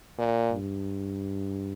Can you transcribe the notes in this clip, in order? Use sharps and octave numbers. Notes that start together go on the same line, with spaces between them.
A#2
G2